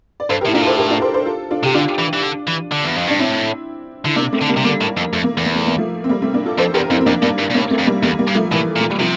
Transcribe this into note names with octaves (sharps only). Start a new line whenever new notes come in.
D5
G2 A4 C5
G4 A#4
A2 E4
A#2 D4 F4
A2 A4 C5
G4 A#4
D4 F4
A4 C5
A4 C5
F4 A4
D4 F4
C3 G4
D3 D4 F4
E3
E3
D3
E3
D3
E2
F2
G2 D4
A2 C4 E4
D3 E4
C3 A#3 D4
A3 C4
D3
G3 A#3
C3
D3 G3 A#3
A2
F2
F2 A3
A#3
E2 A3
A#3
A3
A#3
F3 A3
C4
G3 A#3
A3 C4
A#3 D4
F4 A4
F2 A4 C5
E2 G4 A#4
F2 C4 E4
C4
F2 A#3 D4
G2 G3 A#3
G2
A#2
A2 A#3 D4
A3 C4
F2
G3 A#3
E2 G3 A#3
G3 A#3
G2
F3 A3
A2 E3 G3
A#2
A3
G3
C3 F3